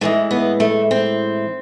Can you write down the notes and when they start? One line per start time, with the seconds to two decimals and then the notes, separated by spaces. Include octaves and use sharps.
0.01 A2 E3 G#3 A3
0.31 B3
0.60 A3
0.91 C4